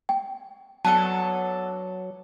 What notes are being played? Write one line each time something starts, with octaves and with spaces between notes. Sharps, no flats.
G5
F#3 B3 D4 A4 A5